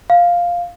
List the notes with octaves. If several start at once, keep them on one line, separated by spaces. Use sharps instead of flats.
F5